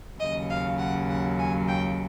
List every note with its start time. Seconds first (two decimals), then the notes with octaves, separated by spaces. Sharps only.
0.19 D#2 C#3 F#3 D#5
0.50 F5
0.78 F#5
1.09 F#5
1.39 G#5
1.68 G5